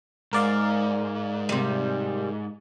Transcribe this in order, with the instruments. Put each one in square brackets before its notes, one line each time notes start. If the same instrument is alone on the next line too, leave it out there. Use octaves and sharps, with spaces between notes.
[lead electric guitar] G#2 [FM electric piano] A#4 D5 F5
[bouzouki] C3 G3